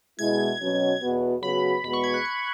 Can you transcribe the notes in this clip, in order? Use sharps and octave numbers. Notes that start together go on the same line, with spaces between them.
B2 G#3 E4 G#6
B2 F#3 C#4
E2 B2 B3 F#4
C#3 F#3 B3 F#4 B5
E2 B2 G#3 B3 F#4 B5
C#6
G#6
F#6
G#6